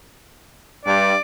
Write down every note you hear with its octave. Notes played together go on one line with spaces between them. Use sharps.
G2 D5